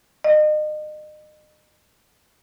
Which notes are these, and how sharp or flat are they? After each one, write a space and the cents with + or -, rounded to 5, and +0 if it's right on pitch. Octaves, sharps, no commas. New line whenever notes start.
D#5 -35